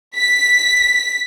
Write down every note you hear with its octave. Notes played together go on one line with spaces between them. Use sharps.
B6